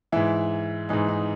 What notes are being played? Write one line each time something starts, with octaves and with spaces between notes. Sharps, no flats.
G#2 E3 E4
G#2 E3 D#4
D#4